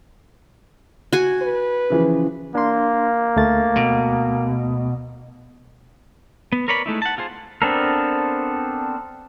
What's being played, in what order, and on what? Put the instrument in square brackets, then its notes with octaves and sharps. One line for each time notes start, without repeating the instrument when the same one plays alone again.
[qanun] F#4 G#5
[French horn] B4
[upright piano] C#3 E3 F3
[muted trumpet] A#3 [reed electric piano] D4 C6
[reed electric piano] D2 A3 A6
[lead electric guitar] B2
[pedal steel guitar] B3
A#4 B4 C#5 D5 B5
G#3 A3 D#4 E4
F#5 A5
F4 G#4 C5
B3 C4 D4 A4 A#4